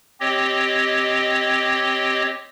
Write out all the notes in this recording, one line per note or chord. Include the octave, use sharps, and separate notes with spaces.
C4 G4 C#5 D#5